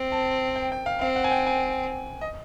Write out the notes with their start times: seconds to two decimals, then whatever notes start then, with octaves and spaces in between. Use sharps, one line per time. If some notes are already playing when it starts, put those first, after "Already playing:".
Already playing: C4
0.12 A5
0.56 G5
0.72 G5
0.86 F5
1.01 C4 F5
1.16 F#5
1.24 G#5
1.31 G5
1.46 G#5
2.21 D#5